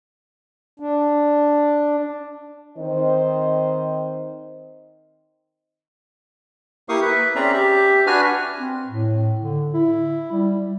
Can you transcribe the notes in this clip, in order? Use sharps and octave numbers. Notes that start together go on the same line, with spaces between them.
D4
D#3 C4 C5 D#5
A#3 E4 G4 F5 C#6 D#6
B4 E5
C4 C#4 G#4 D5 E5 A#5
G4 E5
D4 F#4 B4 G#5 F6
C4
A2
D3
E4
G3